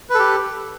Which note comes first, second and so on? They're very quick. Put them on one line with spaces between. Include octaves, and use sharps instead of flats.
B4 A4 G4